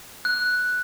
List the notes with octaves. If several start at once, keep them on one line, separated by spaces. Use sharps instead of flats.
F#6